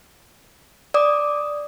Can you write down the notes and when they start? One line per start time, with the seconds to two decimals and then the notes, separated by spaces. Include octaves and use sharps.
0.94 D5 D6 D#6